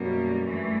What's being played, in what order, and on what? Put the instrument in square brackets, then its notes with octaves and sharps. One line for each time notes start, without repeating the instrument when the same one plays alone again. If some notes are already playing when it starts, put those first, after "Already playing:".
Already playing: [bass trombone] F#2 [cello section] B2 G3 A#3
[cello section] G2 E3 A3